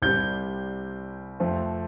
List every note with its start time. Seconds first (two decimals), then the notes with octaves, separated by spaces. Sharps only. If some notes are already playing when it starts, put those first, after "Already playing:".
0.02 C2 C3 G3 C4 G6
1.40 F2 F3 A3 C4